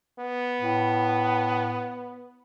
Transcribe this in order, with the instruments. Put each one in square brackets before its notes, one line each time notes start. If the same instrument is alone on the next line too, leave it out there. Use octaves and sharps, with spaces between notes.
[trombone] B3
[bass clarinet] A2